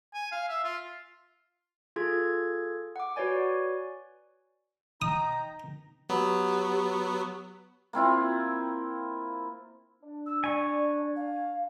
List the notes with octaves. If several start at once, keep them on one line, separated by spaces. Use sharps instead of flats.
G#5
F5
E5
F4
F4 G#4 A4 G#6
F#5 D6
F#4 B4 C#5 D5 G#5
D#4 G5 A#5 D#6
F#3 B3 G4
A#3 C4 E4 F4
D4
E6
D5 G#5 C#6
F5